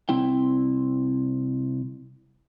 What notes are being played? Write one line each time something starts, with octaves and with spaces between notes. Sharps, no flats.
C2 C4 E4 G5